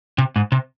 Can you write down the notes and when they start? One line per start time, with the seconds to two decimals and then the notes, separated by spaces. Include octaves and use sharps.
0.18 C3
0.36 G#2
0.52 C3